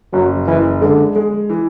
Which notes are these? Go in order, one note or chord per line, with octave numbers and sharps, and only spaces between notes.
F#1 F#3
F#1 E3
D3 G#3
G#3
E3